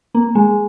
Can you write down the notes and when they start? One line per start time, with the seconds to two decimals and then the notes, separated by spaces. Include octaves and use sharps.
0.15 A#3
0.35 G#3